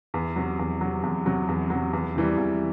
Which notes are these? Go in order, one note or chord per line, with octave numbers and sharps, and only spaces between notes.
E2
C3 F#3
E2
C3 F#3
E2
C3 F#3
E2
C3 F#3
E2
C3 E3 G3
E2